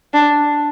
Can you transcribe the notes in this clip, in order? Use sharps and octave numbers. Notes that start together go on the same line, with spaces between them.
D4